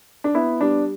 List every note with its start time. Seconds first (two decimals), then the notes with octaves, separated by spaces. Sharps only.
0.24 D4
0.34 B3 E4
0.60 G3 D4